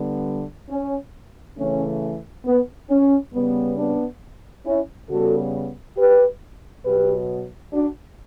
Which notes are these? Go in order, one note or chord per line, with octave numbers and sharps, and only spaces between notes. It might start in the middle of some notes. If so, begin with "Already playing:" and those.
Already playing: D3 G3 B3
C#4
C#3 E3 A3 C#4
B3
C#4
C#3 G3 B3
B3 D4
C#4 E4
C#3 G3 B3 F#4 A4
G4 B4
B2 F#3 B3 G4 B4
D4 F#4